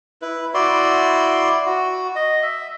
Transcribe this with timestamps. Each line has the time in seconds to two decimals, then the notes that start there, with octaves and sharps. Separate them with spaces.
0.22 E4 B4
0.54 E4 F#4 D5 C6
1.66 F#4
2.15 D#5
2.42 E5